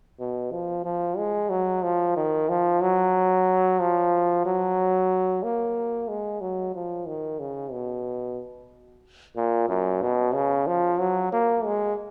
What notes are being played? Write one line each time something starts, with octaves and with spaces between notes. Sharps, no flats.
B2
F3
F3
G#3
F#3
F3
D#3
F3
F#3
F3
F#3
A#3
G#3
F#3
F3
D#3
C#3
B2
A#2
F#2
B2
C#3
F3
F#3
A#3
G#3